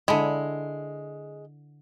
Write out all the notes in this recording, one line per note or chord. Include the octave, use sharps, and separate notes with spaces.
D3 G#3 E4